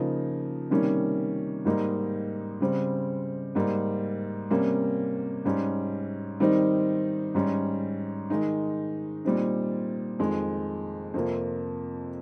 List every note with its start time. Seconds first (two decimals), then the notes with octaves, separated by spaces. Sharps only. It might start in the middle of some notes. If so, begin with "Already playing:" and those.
Already playing: C#3 F3 A#3 D#4
0.70 C3 D#3 G3 A#3 C#4
1.65 G#2 G3 A#3 D#4
2.60 C#3 G3 C4
3.55 G#2 G3 A#3
4.50 C3 G3 A#3 C#4
5.45 G#2 G3 C#4
6.40 D#3 G3 C4 D#4
7.35 G#2 G3 C#4
8.30 D#3 G#3 D#4
9.25 A#2 G3 C4 D#4
10.19 F2 D#3 G#3
11.14 F2 C3 F3 A#3